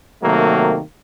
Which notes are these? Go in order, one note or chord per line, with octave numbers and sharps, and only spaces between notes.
C3 D#3 F#3 A3 A#3